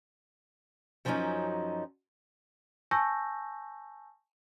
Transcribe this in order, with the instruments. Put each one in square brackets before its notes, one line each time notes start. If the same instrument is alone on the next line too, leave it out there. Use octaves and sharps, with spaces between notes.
[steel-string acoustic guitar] F#2 F3 F#3 B3 C#4 D#4
[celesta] G#5 A5 C#6 E6 G6 A#6